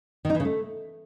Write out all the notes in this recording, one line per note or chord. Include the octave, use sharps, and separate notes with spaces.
D#3
D#4
E3
C#3
A3